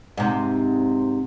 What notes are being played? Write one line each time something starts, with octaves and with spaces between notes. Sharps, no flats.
G#2 C3